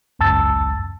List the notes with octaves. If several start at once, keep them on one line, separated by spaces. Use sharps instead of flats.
G#1 C#2 F#2 A5 E6 A6